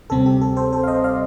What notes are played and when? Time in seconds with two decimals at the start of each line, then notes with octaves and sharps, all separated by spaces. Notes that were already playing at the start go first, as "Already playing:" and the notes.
0.10 D2 C3 G3 C4 A4
0.26 G4
0.41 A4
0.57 A4 C5
0.73 A4 C5
0.83 F5
0.88 C5 D#5
1.04 D5 F5